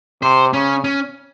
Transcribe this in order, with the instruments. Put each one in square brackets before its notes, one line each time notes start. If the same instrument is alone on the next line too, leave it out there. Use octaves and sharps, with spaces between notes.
[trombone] C3 [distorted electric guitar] C5
[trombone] C#3 [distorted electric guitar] C#4
[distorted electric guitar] C#4